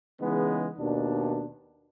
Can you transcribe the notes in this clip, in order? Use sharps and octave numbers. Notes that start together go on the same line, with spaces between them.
C#3 E3 G#3 B3 D#4
D#2 B2 D4